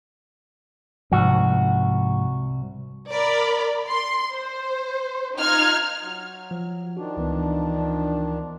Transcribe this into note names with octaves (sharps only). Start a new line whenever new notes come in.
C2 G#2 F3 F#4
A#4 D5 B5
C6
C5
D#4 F4 F6 G#6
F#3
F3
D#3 F3 D4 F#4
C#2 E3 B3